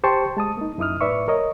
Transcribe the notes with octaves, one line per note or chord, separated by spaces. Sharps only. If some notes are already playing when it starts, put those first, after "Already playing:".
G4 C5 G5 A5 C#6
G#3 A5 D#6
A#3 D#4
F#2 D#4 E4 D#6 F6
A2 B4 D5 E5 C#6
A#4 C#5 D#5